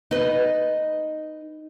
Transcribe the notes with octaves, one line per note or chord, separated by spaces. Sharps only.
D#4 B4